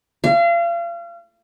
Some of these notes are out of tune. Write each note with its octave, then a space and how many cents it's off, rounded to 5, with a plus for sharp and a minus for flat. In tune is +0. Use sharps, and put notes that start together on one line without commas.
F5 -35